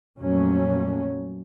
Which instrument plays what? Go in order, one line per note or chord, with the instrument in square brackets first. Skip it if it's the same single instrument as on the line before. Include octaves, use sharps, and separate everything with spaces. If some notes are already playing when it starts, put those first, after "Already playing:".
[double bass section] F2 A#2 F#3 A3 A#3 C#4